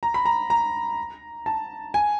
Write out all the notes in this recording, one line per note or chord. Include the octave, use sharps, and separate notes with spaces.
A#5
B5
A#5
A#5
A5
G#5